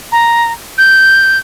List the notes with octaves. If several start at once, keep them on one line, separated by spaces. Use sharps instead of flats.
A#5
G6